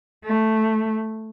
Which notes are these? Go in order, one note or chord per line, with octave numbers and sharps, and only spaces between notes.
A3